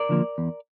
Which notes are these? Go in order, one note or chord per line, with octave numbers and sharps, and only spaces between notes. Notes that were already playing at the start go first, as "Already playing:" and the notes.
Already playing: A#4 D5
D3 F3 A#3
E2